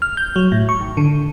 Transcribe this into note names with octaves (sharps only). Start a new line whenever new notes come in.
F6
G6
F#3
A2
C#6
G#1
D3